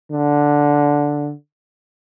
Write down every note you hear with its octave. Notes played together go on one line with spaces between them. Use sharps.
D3